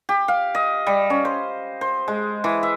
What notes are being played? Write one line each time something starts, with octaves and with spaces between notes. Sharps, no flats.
G4
F5
D#5
G3
C#4
C5
C5
G#3
E3
E5